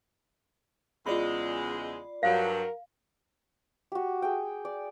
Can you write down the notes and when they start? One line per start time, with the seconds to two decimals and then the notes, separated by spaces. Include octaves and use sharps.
1.06 E2 C#3 G#3 F4 D5 B5
2.23 G2 F#3 A#4 F5
3.92 F#4 G4
4.22 G#4 G5
4.65 D5